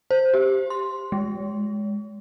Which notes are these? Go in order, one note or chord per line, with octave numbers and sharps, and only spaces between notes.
C5
G4
C6
G#3